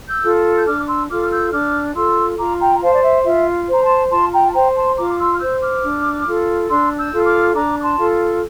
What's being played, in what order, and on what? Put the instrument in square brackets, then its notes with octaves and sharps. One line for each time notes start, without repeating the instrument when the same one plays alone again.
[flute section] E6 G6
F4 A4
G6
D4 D6 F6
D6
C6 E6
F4 A4 D6 F6
F6
E6 G6
D4 D6 F6
F4 A4 C6 E6
F4 A#5 D6
G5 A#5
A#5
C5 F5 A5
D5
E5
F4 E5
C5 A#5
A5 C6
F4 A5 C6
G5 A#5
A5
C5 G5 A#5
A5 C6
F4 A#5 D6
D6
C6 E6
F6
C5 E6 G6
D6 F6
D4
F4 A4
D4 C6 E6
E6 G6
F4 A4
D6 F6
D4 A#5 D6
D6
A5 C6
F4 A4